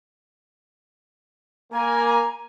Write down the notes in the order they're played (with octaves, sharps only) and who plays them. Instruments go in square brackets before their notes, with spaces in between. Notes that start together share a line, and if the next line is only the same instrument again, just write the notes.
[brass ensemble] A#3 G#5 [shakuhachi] A#5